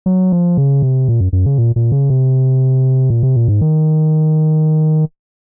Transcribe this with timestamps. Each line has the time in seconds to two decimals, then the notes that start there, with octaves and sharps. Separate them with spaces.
0.06 F#3
0.32 F3
0.57 C#3
0.82 C3
1.09 A#2
1.21 F#2
1.33 F#2
1.46 C#3
1.58 A#2
1.76 A#2
1.92 C#3
2.10 C3
3.10 A#2
3.23 C3
3.36 A#2
3.48 G#2
3.61 D#3